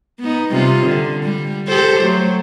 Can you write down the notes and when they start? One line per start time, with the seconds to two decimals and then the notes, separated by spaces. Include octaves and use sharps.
0.20 B3 D#4
0.51 C3 G3 F4
0.87 D3
1.23 G3
1.68 G4 A4 C5
2.03 F#3 A3